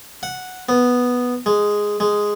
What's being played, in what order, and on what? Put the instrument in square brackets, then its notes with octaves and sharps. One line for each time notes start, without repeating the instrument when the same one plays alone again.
[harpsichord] F#5
B3
G#3
G#3